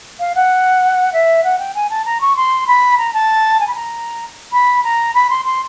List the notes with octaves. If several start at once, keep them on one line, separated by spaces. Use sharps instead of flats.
F5
F#5
E5
F#5
G5
G#5
A5
A#5
C#6
C6
B5
A#5
A5
G#5
B5
A#5
B5
A#5
B5
C6
C6